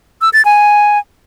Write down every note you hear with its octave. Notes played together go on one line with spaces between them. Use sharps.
E6
A6
G#5